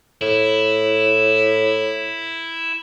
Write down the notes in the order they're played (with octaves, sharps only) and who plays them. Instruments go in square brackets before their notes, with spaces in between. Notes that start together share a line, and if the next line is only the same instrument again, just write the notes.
[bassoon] A2 [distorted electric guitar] E4